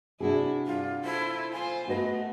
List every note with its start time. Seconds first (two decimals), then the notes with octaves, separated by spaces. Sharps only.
0.20 C3 D4 E4 F#4 G#4
0.66 G2 F4
1.04 E4 F4 A4 C5
1.53 F4 C5 G#5
1.88 A3 B3 F#4 B4 D#5